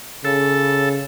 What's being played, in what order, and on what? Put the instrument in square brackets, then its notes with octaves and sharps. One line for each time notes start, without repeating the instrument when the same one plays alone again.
[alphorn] C#3 [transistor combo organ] A4